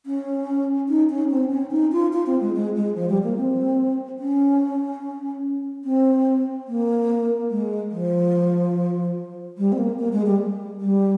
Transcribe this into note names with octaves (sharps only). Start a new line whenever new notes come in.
C#4
D#4
C#4
C4
C#4
D#4
F4
F4
C4
G#3
G#3
G#3
F3
G3
A#3
C4
C#4
C4
A#3
G#3
F3
G3
C4
A#3
A#3
G#3
G3
G3